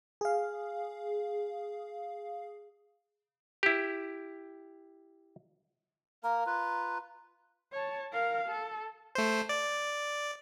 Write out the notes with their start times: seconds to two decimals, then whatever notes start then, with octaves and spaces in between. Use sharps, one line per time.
0.21 G#4 F5
3.63 E4 G4
6.24 A#3 A#4 A#5
6.46 F4 B4
7.72 C#5 A5
8.13 A#4 F5
8.49 A4
9.15 A3 C5
9.49 D5